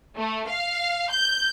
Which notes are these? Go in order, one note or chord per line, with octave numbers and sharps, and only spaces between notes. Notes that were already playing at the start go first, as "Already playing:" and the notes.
A3
F5
G6